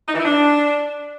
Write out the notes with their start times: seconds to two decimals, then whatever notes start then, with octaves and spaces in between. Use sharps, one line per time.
0.08 D#4
0.14 E3
0.20 E4
0.25 D4